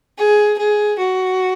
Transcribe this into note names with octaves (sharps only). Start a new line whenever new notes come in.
G#4
G#4
F#4